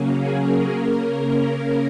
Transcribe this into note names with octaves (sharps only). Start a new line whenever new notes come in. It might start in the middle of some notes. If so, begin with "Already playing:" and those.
Already playing: C#3 F#3 A#3 C#4
G#4
A#4
C#3 A#3 C#4 A#4